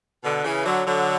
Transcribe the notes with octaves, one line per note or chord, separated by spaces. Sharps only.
B2 D3
C#3 E3
D3 F#3
D3 F#3